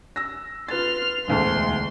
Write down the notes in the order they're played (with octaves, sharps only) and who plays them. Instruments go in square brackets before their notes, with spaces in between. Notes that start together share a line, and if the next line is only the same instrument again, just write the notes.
[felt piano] E6 A#6
[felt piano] F4 B4 A6 [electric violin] C6 F6
[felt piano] E1 D2 A5 [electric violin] C6